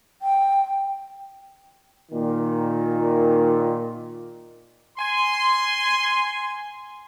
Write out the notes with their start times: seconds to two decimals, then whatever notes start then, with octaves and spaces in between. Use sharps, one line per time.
0.22 G5
2.12 A#2 D#3
4.98 G#5 C6